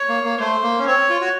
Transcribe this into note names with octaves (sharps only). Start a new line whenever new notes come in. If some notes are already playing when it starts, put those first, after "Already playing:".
Already playing: C#5
A#3
A#3
A3 C5
A#3
C#4
C4 C#5
F4
F#4